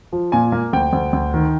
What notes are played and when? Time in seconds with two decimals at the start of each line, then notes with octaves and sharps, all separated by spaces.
0.13 F3
0.32 A#2 G#5
0.52 A#3
0.73 D2 G5
0.93 D2
1.13 D2
1.34 D#3